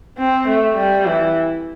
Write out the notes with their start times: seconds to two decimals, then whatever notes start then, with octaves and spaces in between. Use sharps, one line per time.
0.18 C4
0.48 A3
0.76 G3
1.06 E3